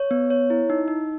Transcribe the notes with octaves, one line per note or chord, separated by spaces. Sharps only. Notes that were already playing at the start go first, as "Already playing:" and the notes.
Already playing: C#5
B3
C#5
E4
D#4
D#4